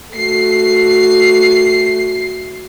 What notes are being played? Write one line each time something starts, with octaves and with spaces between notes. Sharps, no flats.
A3 F#4 C7